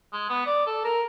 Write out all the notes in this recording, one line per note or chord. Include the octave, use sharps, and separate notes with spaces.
G#3
B3
D5
A4
A#4